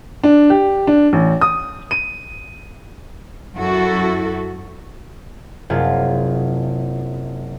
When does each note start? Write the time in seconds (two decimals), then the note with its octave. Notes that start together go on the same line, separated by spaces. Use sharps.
0.23 D4
0.50 G4
0.87 D4
1.13 A1
1.41 D#6
1.91 D#7
3.56 F#2 E4 F#4 A4
5.70 F#1 C3 F4 G#4